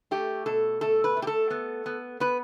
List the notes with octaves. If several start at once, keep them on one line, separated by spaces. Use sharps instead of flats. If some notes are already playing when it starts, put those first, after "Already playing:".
A3 G4
B2 A4
A3 A4
B4
A3
G4
A4
B3
B3
B3 B4